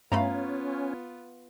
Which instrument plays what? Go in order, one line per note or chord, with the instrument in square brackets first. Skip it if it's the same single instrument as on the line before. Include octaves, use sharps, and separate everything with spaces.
[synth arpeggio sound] G2 A3 B5 [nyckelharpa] B3 F4 [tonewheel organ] C#4 [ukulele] F5 A#5